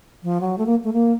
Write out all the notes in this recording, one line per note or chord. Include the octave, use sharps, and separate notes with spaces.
F3
F#3
A3
A#3
A3
A#3